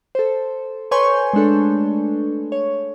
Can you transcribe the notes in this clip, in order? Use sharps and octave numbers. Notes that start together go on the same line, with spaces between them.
A4 C5
B4 C#5 G#5 C6 C#6 G6
G#3 A3 D4 A4
C#5